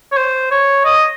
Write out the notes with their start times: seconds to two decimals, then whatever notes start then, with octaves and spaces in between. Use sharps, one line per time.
0.12 C#5
0.17 C5
0.51 C#5
0.85 D#5